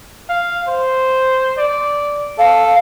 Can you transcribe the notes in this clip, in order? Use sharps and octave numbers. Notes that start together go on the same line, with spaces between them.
F5
C5
D5
A4 F5